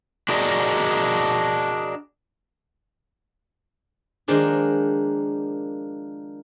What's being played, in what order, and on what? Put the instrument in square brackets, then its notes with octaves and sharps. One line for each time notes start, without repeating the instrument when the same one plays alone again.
[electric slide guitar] D4 F#4 G#4 A#4 D5 D#5
[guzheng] D#3 F3 G#3 A#3 D4 F4